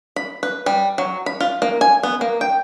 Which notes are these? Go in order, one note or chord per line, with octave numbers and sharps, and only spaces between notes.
B5
B4
G3
F#3
B5
F4
A#3
G#5
B3
A#3
G5